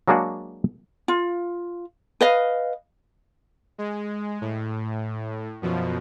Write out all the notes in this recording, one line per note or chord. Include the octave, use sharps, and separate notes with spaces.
F#3 G#3 A#3 D4 F#4 G#4
F4
B4 D#5 F5
G#3
A2
F#2 B2 F3